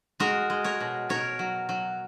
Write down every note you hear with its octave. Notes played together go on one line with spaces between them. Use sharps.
G#3 F#4 A#4
G#3
A#4 C#5
B2
B2 A#4 C#5
F#3
F#3